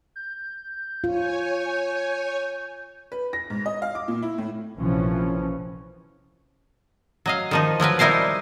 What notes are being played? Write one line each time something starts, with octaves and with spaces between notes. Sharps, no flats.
G6
F4 C#5 G#5
B4
A#6
G#2
D#5
F5
D6
A#2
E4
A2
A#1 C3 E3 F3 C#4
F#3 D#5 F5
D#3 F3 D#4
F3 F#3 A#4 B4
G3 D#4 E4 A#4 C5 F5